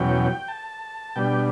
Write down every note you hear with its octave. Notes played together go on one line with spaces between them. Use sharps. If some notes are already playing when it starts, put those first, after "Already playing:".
Already playing: E2 B2 F#3 C#4 G5
A5
B2 G3 D4 G5